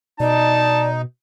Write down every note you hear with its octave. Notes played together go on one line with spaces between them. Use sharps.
B2 D#4 D5 A5